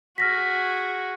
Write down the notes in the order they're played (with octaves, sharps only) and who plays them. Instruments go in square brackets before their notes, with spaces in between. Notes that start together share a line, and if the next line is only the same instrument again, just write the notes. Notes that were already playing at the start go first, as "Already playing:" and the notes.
[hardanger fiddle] F#4 G#4 [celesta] F6 A#6 B6